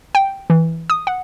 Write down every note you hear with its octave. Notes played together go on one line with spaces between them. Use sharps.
G5
E3
D#6
F#5